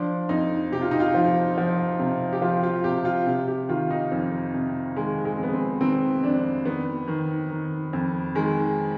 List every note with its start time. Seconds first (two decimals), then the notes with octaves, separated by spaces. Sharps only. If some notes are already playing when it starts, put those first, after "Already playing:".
Already playing: F3 D4
0.29 F2 D#4
0.72 C3 G4
0.82 F4
0.91 D#4
1.00 F4
1.14 F3
1.58 F3
1.99 C3
2.33 G4
2.42 F3 F4
2.63 F4
2.84 C3 G4
3.05 F4
3.27 C3
3.48 G4
3.69 D#3 F4
3.90 D#4
4.12 F2
4.54 C3
4.96 D#3 G#3
5.25 G#3
5.38 F2 B3
5.53 C4
5.81 D#3 C4
6.23 F2 D4
6.65 D#3 B3
7.08 D#3
7.51 D#3
7.93 F2
8.35 D#3 G#3